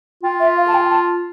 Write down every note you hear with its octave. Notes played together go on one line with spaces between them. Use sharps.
F4 G5
E5
F5
A5
G5
A5